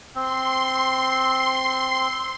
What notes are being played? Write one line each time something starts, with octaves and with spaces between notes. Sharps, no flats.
C4 C6